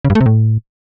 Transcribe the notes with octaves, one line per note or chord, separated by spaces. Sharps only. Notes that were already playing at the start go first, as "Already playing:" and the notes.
C#3
G2
A3
C3
A2